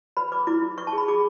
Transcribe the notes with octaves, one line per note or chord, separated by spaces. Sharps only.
B4 B5
B4 D6
E4 D6
E4
B4 C#6
A5
G#4
B5
G#4 D6